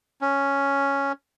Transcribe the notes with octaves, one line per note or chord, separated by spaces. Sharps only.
C#4